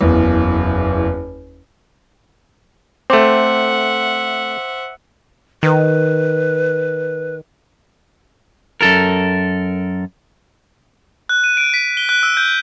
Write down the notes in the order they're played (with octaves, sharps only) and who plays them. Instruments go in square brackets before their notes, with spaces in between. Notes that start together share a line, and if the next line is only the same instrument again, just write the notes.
[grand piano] F#1 E2
[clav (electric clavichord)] A3 C4 [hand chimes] C5 C6 D6 [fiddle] E5 F#5
[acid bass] D#3 [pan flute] B4
[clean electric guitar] F#2 A4 A#4
[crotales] F#6
D#7
D7
B6
G7
F#6
E6
G6